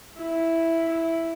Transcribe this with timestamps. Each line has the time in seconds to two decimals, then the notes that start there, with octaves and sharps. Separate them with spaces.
0.17 E4
0.89 E4